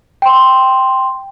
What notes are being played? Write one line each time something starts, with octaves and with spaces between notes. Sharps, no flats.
G5 C6